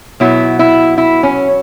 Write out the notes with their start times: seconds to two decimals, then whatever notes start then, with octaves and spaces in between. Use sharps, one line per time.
0.20 B2 F#3 B3 E4
0.59 E4
0.98 E4
1.23 C#4